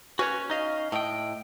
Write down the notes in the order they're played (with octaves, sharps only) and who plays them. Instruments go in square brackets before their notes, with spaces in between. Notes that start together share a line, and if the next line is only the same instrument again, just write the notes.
[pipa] C#4 [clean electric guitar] F#4 B4 C#5
[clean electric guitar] D#4 D#5 F5
[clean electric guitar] A2 G5 [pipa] A4 D#5